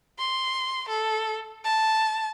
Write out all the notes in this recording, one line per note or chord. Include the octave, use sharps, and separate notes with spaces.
C6
A4
A5